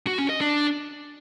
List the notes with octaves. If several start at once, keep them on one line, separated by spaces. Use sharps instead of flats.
F#4
C#4
D#5
D4